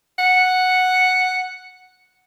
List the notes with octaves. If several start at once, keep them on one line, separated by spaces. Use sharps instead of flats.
F#5